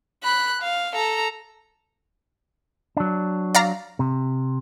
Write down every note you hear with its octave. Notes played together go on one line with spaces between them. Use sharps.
B5 F#6
F5
A4 A#5
F#3 D4
D5 F5 A#5
C3